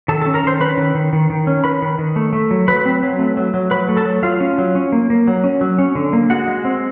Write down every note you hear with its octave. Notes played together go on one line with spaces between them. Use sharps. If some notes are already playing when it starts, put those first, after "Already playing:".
D#3 A4 A5
A4 A5
C#4
A#4 A#5
D#3 C5 C6
C#4 B4 B5
D#3
D#3
D#3
D#3
C#4
D#3 B4 B5
D#3
D#3
A3
A3
F#3
F#3 B4 B5
C4
F#3
A3
F#3
F#3
F#3 B4 B5
A3
A4 A5
F#3
F#3 F4 F5
C#4
F#3
C#4
A#3
A#3
F#3
C#4
F#3
C#4
D3
A#3
G#3 F#4 F#5
G#3
C4